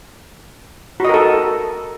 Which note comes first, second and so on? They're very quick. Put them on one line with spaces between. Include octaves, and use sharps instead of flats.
F#4 D#5 A#4 A4